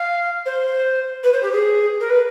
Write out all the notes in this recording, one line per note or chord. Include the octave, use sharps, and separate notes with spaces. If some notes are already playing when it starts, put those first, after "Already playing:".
Already playing: F5
C5
B4
C5
G4
G#4
A#4
B4